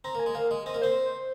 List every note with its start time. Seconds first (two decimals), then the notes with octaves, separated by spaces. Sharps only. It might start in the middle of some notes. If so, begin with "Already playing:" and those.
0.04 C4 A#5
0.15 A#3
0.19 G#5
0.26 G#3
0.35 A#3 F5
0.51 G#3 D#5
0.66 C4 D#5
0.74 A#3
0.82 C4 C5